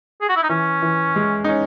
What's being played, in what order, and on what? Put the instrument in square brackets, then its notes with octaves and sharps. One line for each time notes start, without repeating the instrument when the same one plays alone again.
[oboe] G#4
F#4
E4
D#4
[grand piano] E3 [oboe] C#4
[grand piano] E3
G#3
D#4
C#4